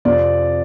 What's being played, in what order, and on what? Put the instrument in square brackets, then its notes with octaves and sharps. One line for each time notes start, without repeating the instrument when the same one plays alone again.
[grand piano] F2 C3 F3 D5